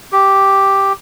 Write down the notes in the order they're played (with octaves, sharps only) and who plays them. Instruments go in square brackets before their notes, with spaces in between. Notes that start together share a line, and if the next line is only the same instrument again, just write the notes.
[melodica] G4